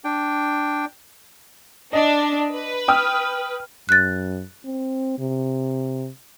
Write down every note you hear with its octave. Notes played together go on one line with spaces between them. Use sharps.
D4 G5
D4 D#5
B4
G5 D#6 F6
F#2 F#6 A6
C4
C3